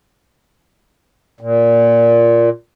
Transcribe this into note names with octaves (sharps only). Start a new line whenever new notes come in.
A#2